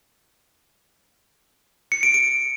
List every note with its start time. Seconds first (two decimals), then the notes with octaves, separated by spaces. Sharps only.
1.92 C#7
2.03 D7
2.14 D7